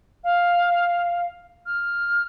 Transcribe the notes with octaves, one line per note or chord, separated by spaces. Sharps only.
F5
F6